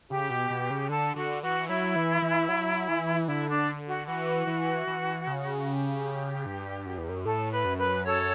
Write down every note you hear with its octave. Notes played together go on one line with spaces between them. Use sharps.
C#3 G4
B2
B2
C#3
D3 A4
D3 F#4
E3 F#4
F#3 E4
E3
E3
F#3
E3
D3 E4
D4
F#4
E3 F#4
E3
E3
C#3
G4
G2
F#2
E2
F#2
A2 A4
B4
F#2
B4
A4 C#5